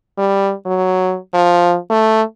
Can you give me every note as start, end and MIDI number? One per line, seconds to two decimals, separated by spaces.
0.18 0.53 55
0.66 1.17 54
1.34 1.76 53
1.90 2.23 57